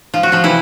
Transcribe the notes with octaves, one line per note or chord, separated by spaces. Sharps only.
F3 F4
F#4
F3 F4
C3 E3 E4